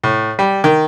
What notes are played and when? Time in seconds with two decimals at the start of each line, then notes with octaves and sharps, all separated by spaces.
0.04 A2
0.39 G3
0.64 D#3